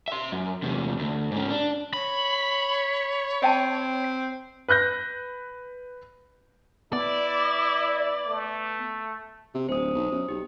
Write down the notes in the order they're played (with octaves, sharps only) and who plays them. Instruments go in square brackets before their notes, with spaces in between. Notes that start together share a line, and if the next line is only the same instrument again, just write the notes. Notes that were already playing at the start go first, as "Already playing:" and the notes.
[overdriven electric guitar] E5 C6
F#2
E2 C3
D2
G#2 C#4
D4
[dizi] C#5 [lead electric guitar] B5
[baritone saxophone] C4 [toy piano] D#5 G5 A5
[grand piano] B4 F#6 G6 A#6
[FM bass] B3 [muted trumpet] E4 [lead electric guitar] D5
[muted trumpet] A3
[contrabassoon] C3
[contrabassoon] D1 [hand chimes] C5 D#6
[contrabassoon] B1
F#2
[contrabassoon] B1 [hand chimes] G4